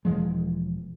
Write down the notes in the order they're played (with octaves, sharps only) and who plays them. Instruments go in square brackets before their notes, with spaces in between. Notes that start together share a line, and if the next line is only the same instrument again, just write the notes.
[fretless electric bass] E1 E3 F3 G#3